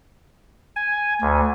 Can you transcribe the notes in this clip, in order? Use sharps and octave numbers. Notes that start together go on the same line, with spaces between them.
G#5
D2